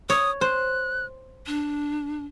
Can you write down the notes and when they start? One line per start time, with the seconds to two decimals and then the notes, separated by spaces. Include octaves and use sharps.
0.10 C#5 D#6
0.41 C5 F#6
1.47 D4